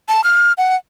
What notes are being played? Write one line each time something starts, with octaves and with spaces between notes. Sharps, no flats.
A5
F6
F#5